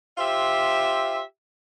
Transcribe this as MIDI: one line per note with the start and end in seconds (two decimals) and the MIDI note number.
0.18 1.22 65
0.18 1.22 67
0.18 1.22 72
0.18 1.22 76